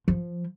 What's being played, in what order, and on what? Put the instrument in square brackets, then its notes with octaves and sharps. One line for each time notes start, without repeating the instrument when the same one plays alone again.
[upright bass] F3